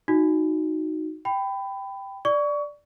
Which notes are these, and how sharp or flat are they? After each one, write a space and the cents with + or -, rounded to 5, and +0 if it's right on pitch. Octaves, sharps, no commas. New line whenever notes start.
D#4 +0 F#4 -10
G5 +0 B5 +20
D5 +0 C#6 +30